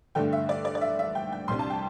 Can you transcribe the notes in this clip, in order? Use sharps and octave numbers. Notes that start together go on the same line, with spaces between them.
G2 D3 A3 D4 G5
E5
D5
D5
D5
E5
E5
G5
G5
C2 C3 G3 D4 C6
A5
G5